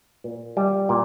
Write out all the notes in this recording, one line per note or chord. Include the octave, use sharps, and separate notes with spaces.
A#2
G3
A#2